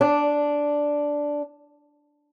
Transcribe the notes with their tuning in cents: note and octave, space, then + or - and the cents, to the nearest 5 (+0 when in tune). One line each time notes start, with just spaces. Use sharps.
D4 -5